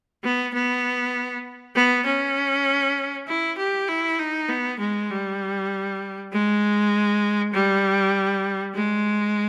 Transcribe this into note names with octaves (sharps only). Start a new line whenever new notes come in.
B3
B3
B3
C#4
E4
G4
E4
D#4
B3
G#3
G3
G#3
G3
G#3